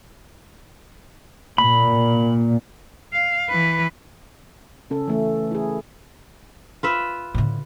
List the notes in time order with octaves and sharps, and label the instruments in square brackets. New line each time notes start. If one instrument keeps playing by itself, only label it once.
[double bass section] A#2 [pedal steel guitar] B5
[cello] F5
E3 B4
[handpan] C#3 C#4 A4
E3 A3 A4
E4 G#4
[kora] F4 B4 E5
[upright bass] A2 D3